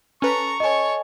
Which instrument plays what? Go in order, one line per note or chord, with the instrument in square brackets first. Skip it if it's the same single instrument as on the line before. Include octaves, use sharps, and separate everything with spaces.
[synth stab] C#4 B4 [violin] A4 A#5 [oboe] C#6
[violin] A4 C#5 [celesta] D#5 G#5